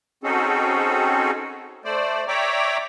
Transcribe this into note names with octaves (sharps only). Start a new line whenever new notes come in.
C4 C#4 D#4 F#4 G#4 A4
A3 C5 D5
C#5 D5 E5 G5 A#5 D6